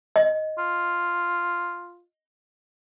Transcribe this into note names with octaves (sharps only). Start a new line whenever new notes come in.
D#5
F4